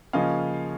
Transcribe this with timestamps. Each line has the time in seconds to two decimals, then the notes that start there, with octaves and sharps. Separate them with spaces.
0.13 C#3 F3 A#3 C#4 D#5 F5